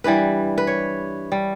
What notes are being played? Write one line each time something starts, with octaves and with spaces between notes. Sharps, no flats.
G2 E3 G3 B4
B4
C#5
G3